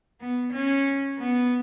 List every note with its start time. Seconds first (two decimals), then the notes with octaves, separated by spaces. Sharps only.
0.21 B3
0.53 C#4
1.19 B3